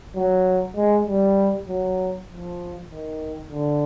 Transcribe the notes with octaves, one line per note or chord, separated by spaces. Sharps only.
F#3
G#3
G3
F#3
F3
D#3
D3